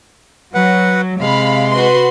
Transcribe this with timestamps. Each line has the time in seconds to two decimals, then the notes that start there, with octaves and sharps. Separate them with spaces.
0.55 F#3 B4 F#5
1.20 C3 G#3 F5 B5
1.71 F#4 B4 C6